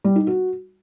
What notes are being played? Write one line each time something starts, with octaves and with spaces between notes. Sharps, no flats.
G3
D#4
F#4